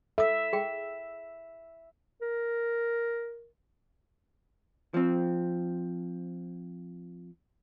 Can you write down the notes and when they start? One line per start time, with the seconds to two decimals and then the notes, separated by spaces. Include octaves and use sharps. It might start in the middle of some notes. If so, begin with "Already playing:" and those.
0.18 A4 E5 D#6
0.53 G#4 G5
2.22 A#4
4.94 F3 C4